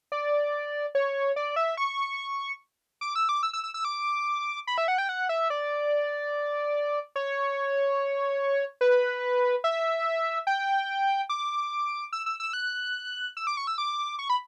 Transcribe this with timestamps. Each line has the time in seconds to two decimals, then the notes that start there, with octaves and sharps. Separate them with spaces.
0.12 D5
0.95 C#5
1.36 D5
1.56 E5
1.77 C#6
3.01 D6
3.15 E6
3.29 D6
3.43 E6
3.53 E6
3.64 E6
3.74 E6
3.85 D6
4.67 B5
4.78 E5
4.88 F#5
4.98 G5
5.09 F#5
5.29 E5
5.50 D5
7.16 C#5
8.81 B4
9.64 E5
10.47 G5
11.29 D6
12.13 E6
12.26 E6
12.40 E6
12.53 F#6
13.37 E6
13.47 D6
13.57 C#6
13.67 E6
13.78 D6
14.19 C#6
14.30 B5